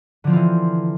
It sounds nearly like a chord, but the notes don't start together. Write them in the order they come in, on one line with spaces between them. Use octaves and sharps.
D3 F3 C4 F4 E3